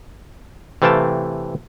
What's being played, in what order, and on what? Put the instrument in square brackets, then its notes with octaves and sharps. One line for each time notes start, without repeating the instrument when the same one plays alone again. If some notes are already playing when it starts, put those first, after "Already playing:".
[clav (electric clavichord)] C3 E3 A3 F5 G5 A5